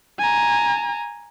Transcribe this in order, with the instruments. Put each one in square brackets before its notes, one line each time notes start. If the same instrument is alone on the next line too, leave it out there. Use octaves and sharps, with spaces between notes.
[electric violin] G#5 A#5